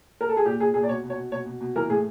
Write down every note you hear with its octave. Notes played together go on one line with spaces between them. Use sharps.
A#4
A4
G#4
A#2 G4
A#2 G#4
A#2 G#4
D5
B2 C#5
B2
C#5
B2
B2 C#5
B2
B2
E3 A#4
A2 G#4